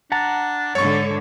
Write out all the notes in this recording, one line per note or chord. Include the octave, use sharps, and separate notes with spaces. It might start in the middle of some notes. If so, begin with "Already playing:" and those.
D4 F#5 A5 A#5
G#2 D3 A4 C#5 C#6